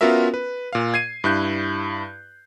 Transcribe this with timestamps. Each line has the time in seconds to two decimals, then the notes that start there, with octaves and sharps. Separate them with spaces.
0.01 B3 C#4 F4 F#4 A#4 E5
0.34 B4
0.73 A#2 F5
0.94 G#6 C7 D#7
1.24 G2 E4 F#6 G6